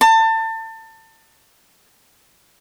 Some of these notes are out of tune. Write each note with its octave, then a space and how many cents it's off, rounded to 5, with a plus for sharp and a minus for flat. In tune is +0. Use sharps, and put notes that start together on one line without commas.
A5 +30